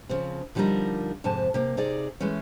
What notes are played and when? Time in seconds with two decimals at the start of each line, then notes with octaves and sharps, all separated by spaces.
0.09 C#3 F3 C4
0.55 D3 F3 G3 D4 D#4 A#4
1.24 F2 G#2 C3 G#5 A5
1.54 C3 A#3
1.77 C3 D#4 G#4 D5
2.20 E3 G#3 A3 C#4